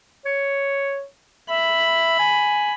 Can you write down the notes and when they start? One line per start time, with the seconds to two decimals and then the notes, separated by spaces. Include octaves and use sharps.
0.26 C#5
1.50 E5 B5
2.19 G#5